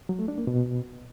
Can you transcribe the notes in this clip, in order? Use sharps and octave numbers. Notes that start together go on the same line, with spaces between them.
F#3
A3
D4
A#3
B2